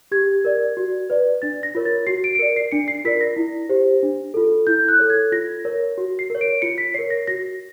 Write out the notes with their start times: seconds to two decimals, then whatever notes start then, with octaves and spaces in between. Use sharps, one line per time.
0.11 G4 G#6
0.45 A#4 D5
0.77 F#4
1.10 B4 D5
1.42 D4 A6
1.63 A#6
1.75 F4 A#4 C#5
1.85 A6
2.07 F#4 C7
2.24 D7
2.35 D7
2.39 A#4 D5 C#7
2.56 C7
2.71 D4 C#7
2.88 C7
3.05 F4 A#4 D5 B6
3.21 A#6
3.37 E4
3.69 G4 C5
4.03 D4
4.34 F4 A4
4.67 E4 G6
4.88 F#6
4.99 A4 C#5
5.10 G#6
5.32 F4 A#6
5.65 A#4 C#5
5.98 F#4
6.19 C7
6.30 A#4 C#5
6.41 D7
6.62 F4 C#7
6.78 B6
6.94 A#4 C#5 C7
7.10 A#6
7.27 F#4 A#6